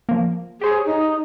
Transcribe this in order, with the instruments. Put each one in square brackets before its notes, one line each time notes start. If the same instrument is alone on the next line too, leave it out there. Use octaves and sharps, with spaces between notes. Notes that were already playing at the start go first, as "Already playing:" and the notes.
[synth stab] F3 A#3
[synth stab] G4 C5 C#5 [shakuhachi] G#4
[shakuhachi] D#4